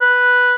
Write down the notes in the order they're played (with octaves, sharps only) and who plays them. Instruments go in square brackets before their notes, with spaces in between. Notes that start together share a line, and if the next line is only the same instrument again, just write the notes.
[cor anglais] B4